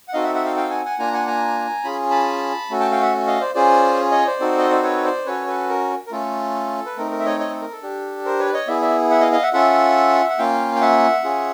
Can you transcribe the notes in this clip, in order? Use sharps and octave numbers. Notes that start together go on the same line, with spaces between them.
F#5
C4 D#4 F#4 A4 D#5 F5
E5 F#5
E5 F#5
F5 G5
F5 G5
F#5 G#5
F#5 G#5
A#3 D4 F4 G#5 A#5
F#5 G#5
G#5 A#5
C#4 F4 G#4 B5
A5 B5
A3 C#4 F#4 A4
G5 A5
F5 G5
E5 F#5
D#5 F5
C5 D5
C#4 F4 G#4 C5 D5
C#5 D#5
C5 D5
C4 D#4 F#4 A4
D#5
D5
B4 C#5
C5 D5
C#4 F#4 A4 B4 C#5
A4 B4
A#4
A#4
A3 C#4 F4 A4
B4
A3 C4 D#4 A#4
A#4
E5
C#5 D#5
C#5 D#5
A4
A#4
A4
D4 G4
A#4 C5
B4 C#5
D5
C#5 D#5
B3 E4 G#4 D5 E5
D5 E5
E5 F#5
D#5 F5
D#5 F5
E5 F#5
C#4 F4 A4 E5 F#5
F#5
A#3 C#4 F4 F5 G5
G5
E5 F#5
C#4 F4 G#4